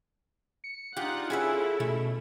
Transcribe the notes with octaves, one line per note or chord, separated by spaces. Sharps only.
C#7
D4 D#4 F4 G4 F#5
C#4 E4 G#4 A4 B4 E5
B2 A3